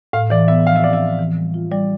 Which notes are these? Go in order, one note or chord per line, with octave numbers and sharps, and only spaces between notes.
A2 F5
E3 D5
B3 E5
F3 F5
E5
C4 D5
E5
F3
E3
G3
F4
G3 D5